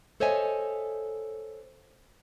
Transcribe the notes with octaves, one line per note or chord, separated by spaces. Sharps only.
A4 C5 C#5 D#5 E5 G#5